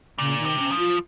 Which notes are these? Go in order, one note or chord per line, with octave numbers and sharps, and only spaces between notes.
A#2 C#3
D#3
C3
C#4
F3
F4